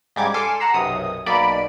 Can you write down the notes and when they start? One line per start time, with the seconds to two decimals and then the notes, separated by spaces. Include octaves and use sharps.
0.16 G#2 C#3 G3 D6 G#6
0.34 A4 G#5 C6 D6 E6 F6
0.60 F#5 A#5 E6 C7
0.74 B1 F#2 C3 D#6
1.26 B1 B2 A#3 D5 B5 D7